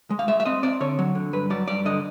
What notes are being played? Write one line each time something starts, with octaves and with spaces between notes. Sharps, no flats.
G#3
F5
G#3 E5
E5
C4 D#5
C4 D5
D3 C#5
F#3
D3
G2 B4
F#3 D5
G2 D5
D3 D#5